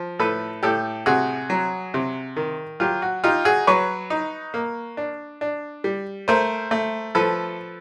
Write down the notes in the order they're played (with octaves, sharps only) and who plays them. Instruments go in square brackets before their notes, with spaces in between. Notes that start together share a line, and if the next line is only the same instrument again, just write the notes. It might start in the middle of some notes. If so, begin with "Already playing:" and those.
Already playing: [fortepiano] F3
A2 A4 B4
A2 G4 A4
C3 F#4 G#4
F#3
C3
D#3
F#3 F4 G4
F#4
D#4 F4 G4
F#4 G#4
F#3 B4 C#5
D#4
A#3
D4
D4
G3
A3 A#4 C5
A3
F3 A4 B4